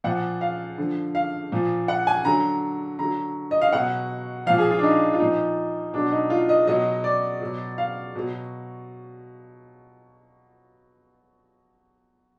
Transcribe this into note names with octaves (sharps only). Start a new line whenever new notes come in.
A#2 F3 F#5
F5
D3 F3
F5
A#2 F3
F#5
G#5
D3 F#3 A#5
D3 F#3 A#5
D#5
F5
B2 F#3 F#5
A#2 F3 F5
G#4
F4
D4
D#4
F4
A#2 F3 D#4
B2 F#3 D4
D#4
F4
D#5
B2 F#3 D#5
D5
B2 F#3
F5
B2 F#3